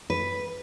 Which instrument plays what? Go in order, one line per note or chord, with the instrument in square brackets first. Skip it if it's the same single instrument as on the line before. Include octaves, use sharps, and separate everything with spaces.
[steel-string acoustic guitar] B4